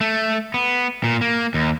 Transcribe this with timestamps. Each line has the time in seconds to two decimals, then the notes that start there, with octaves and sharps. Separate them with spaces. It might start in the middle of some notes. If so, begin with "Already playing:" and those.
0.01 A3
0.54 B3
1.04 A#2
1.21 A#3
1.54 D#2